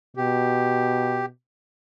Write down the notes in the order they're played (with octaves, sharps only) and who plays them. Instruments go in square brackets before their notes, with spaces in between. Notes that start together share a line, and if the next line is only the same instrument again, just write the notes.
[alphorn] B2 [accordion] G4